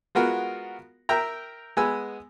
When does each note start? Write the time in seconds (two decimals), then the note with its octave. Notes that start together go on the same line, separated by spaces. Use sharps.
0.15 G#3 B3 F4 F#4 A#4
1.09 A#4 E5 G5 A#5
1.77 G#3 B3 G#5 E6